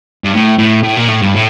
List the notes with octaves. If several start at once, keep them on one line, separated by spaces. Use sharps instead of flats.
G2
A2
A2
A2
A#2
A2
G2
A2